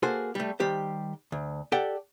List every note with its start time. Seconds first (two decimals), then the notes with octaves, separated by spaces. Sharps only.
0.03 A#3 F#4 G#4 A4 C5
0.35 G3 A3
0.60 D#3 G3 G4 C5
1.32 D2
1.72 G4 A4 D5 F#5 G5